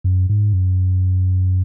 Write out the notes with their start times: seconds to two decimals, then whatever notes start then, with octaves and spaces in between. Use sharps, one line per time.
0.04 F#2
0.29 G#2
0.53 F#2